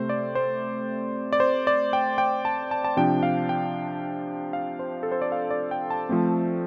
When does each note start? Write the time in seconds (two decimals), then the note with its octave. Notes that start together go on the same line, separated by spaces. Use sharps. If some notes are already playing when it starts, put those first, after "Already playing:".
Already playing: C3 A3 C4 C5
0.09 D5
0.35 C5
1.33 D5
1.40 C5
1.67 D5
1.93 G5
2.18 G5
2.45 A5
2.71 A5
2.85 A5
2.97 C3 F3 D4 G5
3.23 F5
3.49 G5
4.53 F5
4.79 C5
5.03 A4
5.12 C5
5.22 D5
5.32 F5
5.51 D5
5.71 G5
5.90 A5
6.09 F3 A3 C4